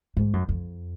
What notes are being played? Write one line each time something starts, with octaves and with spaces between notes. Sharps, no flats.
G#2
F#2
F2